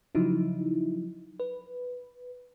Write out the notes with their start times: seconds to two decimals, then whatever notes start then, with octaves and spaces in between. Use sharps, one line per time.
0.15 C#3 F3 F#3 D#4 E4
1.40 B4